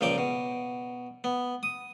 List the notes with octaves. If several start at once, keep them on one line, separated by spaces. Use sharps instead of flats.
C#2 A#2 F3 G5 D6
B2
B3
D#6